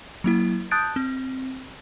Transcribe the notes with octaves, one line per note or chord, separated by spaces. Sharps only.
F#3 A#3 E4
A5 D#6 F#6 G6 A6 D7
C4